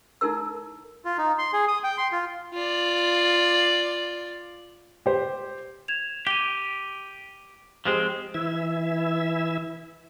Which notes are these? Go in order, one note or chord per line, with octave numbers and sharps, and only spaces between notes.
D#4 E4 A4 A#4 E6
F4
D#4
C6
G#4
D#6
G5
C6
F4
F4 D5
G4 C5
G#6 E7 F7
G4 D#7 F7 G7
F3 G#3 C4 G4 G#4 C5
E3 E4 E5